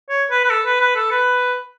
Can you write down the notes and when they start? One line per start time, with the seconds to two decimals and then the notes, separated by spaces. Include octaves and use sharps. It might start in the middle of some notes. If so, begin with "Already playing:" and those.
0.09 C#5
0.30 B4
0.44 B4
0.50 A4
0.66 B4
0.80 B4
0.95 A4
1.11 B4